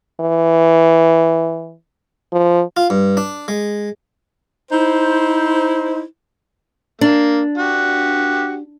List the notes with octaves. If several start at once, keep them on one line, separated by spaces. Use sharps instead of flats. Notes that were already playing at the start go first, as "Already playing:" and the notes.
E3
F3
F4
G2
D4
G#3
D#4 E4 C5
A#3 D4
F#4 G4